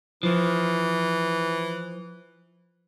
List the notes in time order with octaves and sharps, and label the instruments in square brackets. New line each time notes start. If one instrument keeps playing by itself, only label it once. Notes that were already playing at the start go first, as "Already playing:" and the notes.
[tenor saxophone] E3 [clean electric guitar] F3